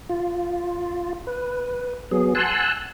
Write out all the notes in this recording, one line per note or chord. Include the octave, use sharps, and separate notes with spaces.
F4
B4
F#3 B3 G#4
F#5 G#5 A5 C6 E6 F#6